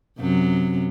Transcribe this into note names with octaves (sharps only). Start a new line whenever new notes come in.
F#2 C3 F#3